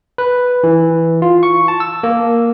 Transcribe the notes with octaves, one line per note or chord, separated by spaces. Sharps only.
B4
E3
F4
C#6
A5
E6
A#3